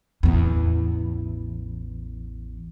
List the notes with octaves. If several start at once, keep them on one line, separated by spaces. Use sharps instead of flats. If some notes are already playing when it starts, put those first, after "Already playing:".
A1 E2